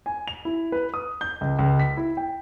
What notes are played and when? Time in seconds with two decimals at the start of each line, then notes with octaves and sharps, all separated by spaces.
0.06 G#5
0.28 F7
0.45 E4
0.72 B4
0.94 D#6
1.21 G6
1.41 C#2
1.59 C#2
1.80 B6
1.97 E4
2.17 G5